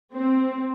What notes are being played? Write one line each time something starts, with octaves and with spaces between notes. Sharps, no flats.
C4